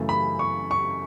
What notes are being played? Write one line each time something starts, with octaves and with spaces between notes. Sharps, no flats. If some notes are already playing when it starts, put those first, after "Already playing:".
Already playing: F#2 C#3 E3 A3
B5
C#6
C#6